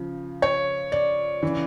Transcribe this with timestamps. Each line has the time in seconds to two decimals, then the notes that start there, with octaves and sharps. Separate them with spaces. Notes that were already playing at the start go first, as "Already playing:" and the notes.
Already playing: C#3 F3
0.42 C#5
0.92 D5
1.43 C#3 E3